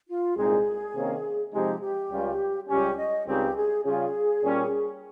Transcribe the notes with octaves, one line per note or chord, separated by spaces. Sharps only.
F4
C2 A#2 G#3 C4 D#4 G#4
C3 D#3 A#3 C#4
C3 F3 G#3 C4 D#4 G4
G4
C#2 C#3 G3 C#4 F4
C#2 C#3 G3 C#4 G4
D#5
C#2 C#3 G3 C4 D#4 G4
G#4
C#3 G3 C#4 F4 G#4
A#2 G3 C#4